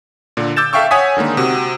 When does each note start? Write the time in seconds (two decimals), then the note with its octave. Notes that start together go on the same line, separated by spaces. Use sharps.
0.37 A#2 D3
0.56 D6 E6 G6 A6 E7
0.73 A4 E5 F5 G5 C#6 E6
0.91 C#5 F#5 G#5 D#6 B6
1.17 D3 D#3 G#3 A#3
1.37 C3 F#4